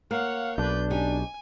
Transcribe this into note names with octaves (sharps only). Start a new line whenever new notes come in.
A#3 C#5 F5 F#5
B1 D4 B4 G6
C#4 D#4 G4 G#5